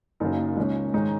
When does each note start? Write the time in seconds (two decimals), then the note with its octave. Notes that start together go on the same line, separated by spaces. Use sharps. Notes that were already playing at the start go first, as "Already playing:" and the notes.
0.20 F#1 F#2 C#3 A#3 D#4
0.57 C#2 C#3 A#3 C#4
0.94 G#2 D#3 G#3 C#4 D#4